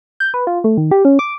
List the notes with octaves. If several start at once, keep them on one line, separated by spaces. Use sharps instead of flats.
G6
B4
F4
A3
D#3
G4
C#4
D6